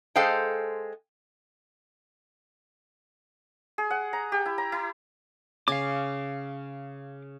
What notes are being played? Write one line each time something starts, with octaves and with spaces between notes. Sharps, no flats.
G#3 A4 C5 F5 G5
G#4
F#5
A#5
G4
E4
A#5
E4
C#3 F5 G#5 D6